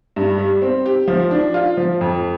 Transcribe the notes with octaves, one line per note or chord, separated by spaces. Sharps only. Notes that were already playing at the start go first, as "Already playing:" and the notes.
G2
G3
C4
G4
F3
D4
F4
F3
F2